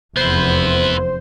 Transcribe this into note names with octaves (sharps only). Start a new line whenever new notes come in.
F1 E2 B3 E4 C5